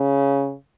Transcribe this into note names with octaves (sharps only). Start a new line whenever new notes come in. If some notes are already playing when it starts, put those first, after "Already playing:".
Already playing: C#3